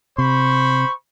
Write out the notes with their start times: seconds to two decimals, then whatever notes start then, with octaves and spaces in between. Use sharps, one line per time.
0.18 C3 C5 B5 C#6